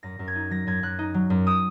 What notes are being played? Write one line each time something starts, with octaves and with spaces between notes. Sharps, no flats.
F#2 A#6
F#2
G#6
D#4
F#3 A#6
F#2 G#6
F#2 F#6
D#4
F#3
F#2
D#6